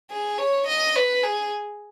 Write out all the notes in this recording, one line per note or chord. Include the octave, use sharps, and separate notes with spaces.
G#4
C#5
D#5
B4
G#4